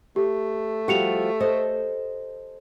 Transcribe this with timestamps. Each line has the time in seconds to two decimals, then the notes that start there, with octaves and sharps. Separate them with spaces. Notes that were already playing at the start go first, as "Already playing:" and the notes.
0.16 A3 G4
0.88 F3 G3 F#4 G4 C#7 F7
1.40 A4 C5 D#5